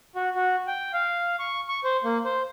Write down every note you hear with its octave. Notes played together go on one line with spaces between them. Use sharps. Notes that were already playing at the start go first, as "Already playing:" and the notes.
F#4
F#4
G5
F5
C#6
C#6
C5
A#3
C5